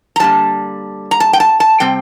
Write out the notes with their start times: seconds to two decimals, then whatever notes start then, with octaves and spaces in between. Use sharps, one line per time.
0.16 A#5
0.20 G2 D3 G3 A#3 A5
1.11 A#5
1.20 A5
1.33 G5
1.40 A5
1.60 A5
1.80 C3 G3 C4 G5